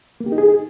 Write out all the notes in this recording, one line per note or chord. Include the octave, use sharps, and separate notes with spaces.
A#3
G4
D#4
G#4